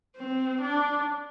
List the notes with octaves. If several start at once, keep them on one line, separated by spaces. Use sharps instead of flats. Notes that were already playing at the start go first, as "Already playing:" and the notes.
C4
D4